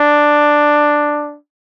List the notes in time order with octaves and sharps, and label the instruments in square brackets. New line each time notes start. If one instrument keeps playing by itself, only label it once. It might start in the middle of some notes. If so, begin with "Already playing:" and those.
Already playing: [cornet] D4